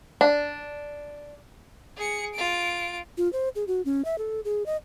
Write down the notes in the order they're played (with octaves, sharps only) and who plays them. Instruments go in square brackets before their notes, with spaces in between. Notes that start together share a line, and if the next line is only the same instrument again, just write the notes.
[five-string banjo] D4
[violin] G#4 C#7
F4 D7
[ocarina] F4
C5
G#4
F#4
C#4
E5
A4
G#4
D#5